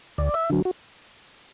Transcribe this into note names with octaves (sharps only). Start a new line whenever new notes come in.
D2 D5
E5
D3 F#3
F#4